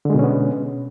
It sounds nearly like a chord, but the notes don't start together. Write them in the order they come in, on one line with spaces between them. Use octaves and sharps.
D3 G#3 B2 C#4 B3